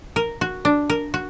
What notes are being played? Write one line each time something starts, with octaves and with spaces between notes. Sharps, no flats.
A#4
F#4
D4
A#4
F#4